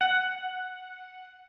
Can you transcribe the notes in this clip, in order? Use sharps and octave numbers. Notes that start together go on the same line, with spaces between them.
F#5